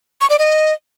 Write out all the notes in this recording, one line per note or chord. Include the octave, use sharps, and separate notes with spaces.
C#6
D5
D#5